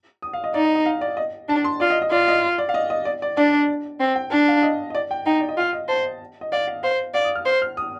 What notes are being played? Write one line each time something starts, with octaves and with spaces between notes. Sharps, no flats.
D#6
F5
D#5
D#4 D5
D#5
D#5
F5
D5
D#5
D4 A5
C6
F4 D5
D#5
D#5
F4 D5
D#5
D5
F5
D#5
D#5
D5
D5
D4 D5
C4
G5
D4 A5
F5
D#5
D#5
D5
G5
D#4 G5
D5
D#5
F4 F5
D#5
C5 A5
D#5
D5 F5
F5
C5 F5
D5 F5
D#6
F6
C5
F6
D#6